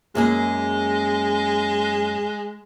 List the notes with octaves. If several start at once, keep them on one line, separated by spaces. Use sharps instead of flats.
F#2 G#3 A#3 G#4